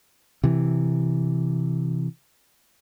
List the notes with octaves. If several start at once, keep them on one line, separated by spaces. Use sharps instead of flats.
C3 E3